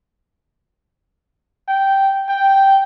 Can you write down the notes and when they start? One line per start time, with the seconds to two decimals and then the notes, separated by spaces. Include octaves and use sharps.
1.68 G5
2.29 G5